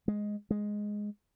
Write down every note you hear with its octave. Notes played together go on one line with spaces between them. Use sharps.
G#3
G#3